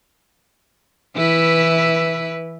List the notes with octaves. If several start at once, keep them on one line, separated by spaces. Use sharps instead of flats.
E3 E4 B4